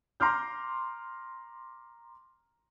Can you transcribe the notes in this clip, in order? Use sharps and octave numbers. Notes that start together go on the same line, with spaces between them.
A#5 C6 D6 F6 G6